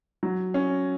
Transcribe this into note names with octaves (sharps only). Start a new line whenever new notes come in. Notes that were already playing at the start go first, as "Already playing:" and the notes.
F#3
C#4